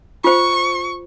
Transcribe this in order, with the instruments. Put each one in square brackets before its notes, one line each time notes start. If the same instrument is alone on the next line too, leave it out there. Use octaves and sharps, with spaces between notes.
[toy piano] F4 C5 [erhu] C#6